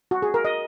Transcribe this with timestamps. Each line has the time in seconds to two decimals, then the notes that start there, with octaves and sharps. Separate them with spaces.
0.11 F#4
0.22 G#4
0.34 A#4
0.45 D#5